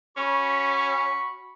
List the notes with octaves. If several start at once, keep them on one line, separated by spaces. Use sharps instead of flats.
C#4 F#4 B5 C#6